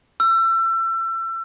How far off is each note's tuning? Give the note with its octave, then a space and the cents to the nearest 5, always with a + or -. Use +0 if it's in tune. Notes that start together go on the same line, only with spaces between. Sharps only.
E6 +30